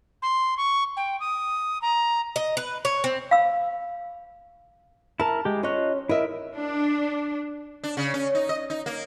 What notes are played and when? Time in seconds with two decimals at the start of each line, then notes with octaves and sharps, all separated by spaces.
0.22 C6
0.57 C#6
0.97 G5
1.20 D#6
1.82 A#5
2.36 D#5
2.57 B4
2.85 C#5
3.04 C4
3.31 F5 B5 E6
5.20 E4 A#4 A5 A#5
5.45 G#3 G4
5.63 C#4 F4 C#5 D#5 F#6
6.09 E4 A#4 D#5 E5
6.55 D4
7.84 D4
7.97 C#3
8.14 C#4
8.35 D#4
8.49 D#5
8.70 D#4
8.86 A#3